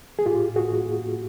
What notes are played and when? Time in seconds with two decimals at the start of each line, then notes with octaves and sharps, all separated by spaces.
0.19 G#4
0.26 A2 F4 G4
0.56 F#4 G#4